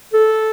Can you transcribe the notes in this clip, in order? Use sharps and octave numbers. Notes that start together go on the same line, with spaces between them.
A4